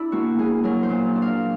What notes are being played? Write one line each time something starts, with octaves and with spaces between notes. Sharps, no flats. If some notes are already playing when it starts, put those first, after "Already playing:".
Already playing: D4 E4
A#3 F#4
A#3 G#4
F#3 A#4
C5
A#2
D4
F5